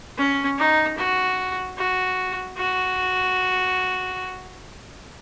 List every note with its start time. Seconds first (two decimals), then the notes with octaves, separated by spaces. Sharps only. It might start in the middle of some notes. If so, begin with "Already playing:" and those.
0.18 C#4
0.58 D#4
0.98 F#4
1.78 F#4
2.58 F#4